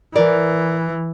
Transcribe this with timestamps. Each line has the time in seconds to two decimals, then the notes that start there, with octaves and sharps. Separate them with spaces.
0.15 E3 A#4 D5